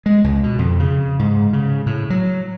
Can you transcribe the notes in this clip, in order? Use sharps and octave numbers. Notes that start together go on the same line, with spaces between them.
G#3
C#2
B2
F2
C#3
G#2
C#3
A2
F#3